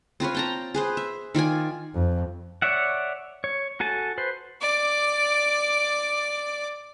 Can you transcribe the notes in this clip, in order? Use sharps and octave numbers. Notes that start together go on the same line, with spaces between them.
C4 F4 B4 C#5
G5 A5 A#5
G#4 B4 C5
E5
D#3 F4 D5 G#5
F2
C#5 D5 E5 F#5
C#5
F#4 A4 G#5 A5
B4 C5
D5 D6